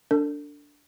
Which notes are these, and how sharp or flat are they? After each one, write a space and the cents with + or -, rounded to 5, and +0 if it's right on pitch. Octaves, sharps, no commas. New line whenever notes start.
D4 -10 A4 +40